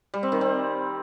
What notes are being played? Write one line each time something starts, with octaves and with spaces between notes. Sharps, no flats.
G3
C4
D#3
C4